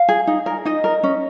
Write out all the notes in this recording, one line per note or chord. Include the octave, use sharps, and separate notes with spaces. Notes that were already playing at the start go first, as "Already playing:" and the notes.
Already playing: F5
G#4
D#4
A#4
D#4 D#5
A#4
C#4